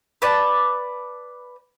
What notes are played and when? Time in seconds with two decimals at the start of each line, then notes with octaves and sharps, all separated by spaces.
0.22 B4 D5 A5